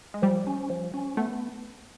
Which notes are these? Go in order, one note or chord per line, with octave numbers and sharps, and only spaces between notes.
G#3
F3 G3
C#4
F3
C#4
A3 B3